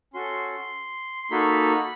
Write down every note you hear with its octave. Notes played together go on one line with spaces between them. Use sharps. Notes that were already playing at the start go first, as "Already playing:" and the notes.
C#4 F#4 A4 C6
C6
A#3 D#4 F#4 A4 B5